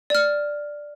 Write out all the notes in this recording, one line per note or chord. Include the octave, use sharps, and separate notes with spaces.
D5 F6